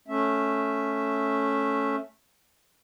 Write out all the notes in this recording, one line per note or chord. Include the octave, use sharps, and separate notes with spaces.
A3 C#4 E5